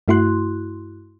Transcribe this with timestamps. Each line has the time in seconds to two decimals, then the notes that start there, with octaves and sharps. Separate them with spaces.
0.08 G2 A3 E4 F#4 C6 F#6